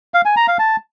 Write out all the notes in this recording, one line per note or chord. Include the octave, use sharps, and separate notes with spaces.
F5
G#5
A#5
F5
A5